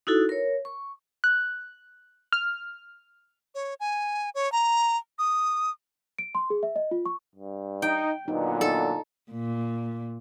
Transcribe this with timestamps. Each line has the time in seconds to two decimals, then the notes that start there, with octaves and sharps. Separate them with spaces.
0.07 D#4 E4 F#4 A4
0.29 A#4 C#5
0.65 C#6
1.24 F#6
2.32 F6
3.55 C#5
3.80 G#5
4.35 C#5
4.52 A#5
5.19 D#6
6.19 D7
6.35 C6
6.50 G#4
6.63 E5
6.76 D#5
6.91 F4
7.06 C#6
7.35 G2
7.82 D#4 G5
8.28 A#2 D3 F#3 B3 D#4
8.61 D#4 A4
9.32 A#2